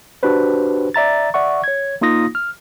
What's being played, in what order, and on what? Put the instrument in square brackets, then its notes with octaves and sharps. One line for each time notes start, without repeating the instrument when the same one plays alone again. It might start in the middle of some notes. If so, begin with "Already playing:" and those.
[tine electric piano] D4 F#4 G4 B4 C5
D5 E5 A#5 A6
D5 E5 F#5 C#6
C#5 G#6
A#3 D#4 F4 D#6 A#6
F6